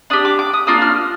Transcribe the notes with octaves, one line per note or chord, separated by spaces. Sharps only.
D4 G4 D#6
D6
D6
D#6
A#3 D4 F4 D#6
F6